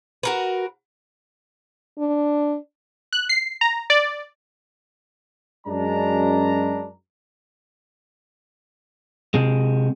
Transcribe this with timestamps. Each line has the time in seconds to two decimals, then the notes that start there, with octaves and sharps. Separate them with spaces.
0.23 F#4 A#4 B4
1.99 D4
3.13 F#6
3.29 C7
3.61 A#5
3.90 D5
5.67 F#2 G#3 D4 A#5
9.34 C3 G#3